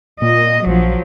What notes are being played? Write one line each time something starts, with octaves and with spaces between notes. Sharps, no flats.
A#2 D#5
A#1 F3 F#3